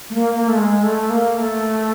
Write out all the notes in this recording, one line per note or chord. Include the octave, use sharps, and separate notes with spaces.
A3
A#3
A#3
A3
G#3
A3
A#3
A3